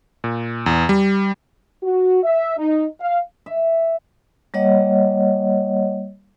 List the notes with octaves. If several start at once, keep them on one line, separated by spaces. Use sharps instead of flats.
A#2
E2
G3
F#4
E5
D#4
F5
E5
G3 A#3 C#5 D#5 F#5